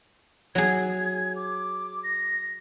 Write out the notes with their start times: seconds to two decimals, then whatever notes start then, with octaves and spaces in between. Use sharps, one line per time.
0.55 F#3 G#4 G#6
1.36 D6
2.04 A#6